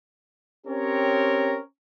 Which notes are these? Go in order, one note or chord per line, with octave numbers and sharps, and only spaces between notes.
C4 C#4 G4 A#4 C#5